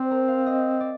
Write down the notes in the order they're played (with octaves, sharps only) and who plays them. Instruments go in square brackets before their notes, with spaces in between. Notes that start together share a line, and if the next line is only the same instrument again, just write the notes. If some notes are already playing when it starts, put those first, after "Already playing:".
Already playing: [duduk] C4 [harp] C5 D5
[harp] A#4
F5
D#5
D5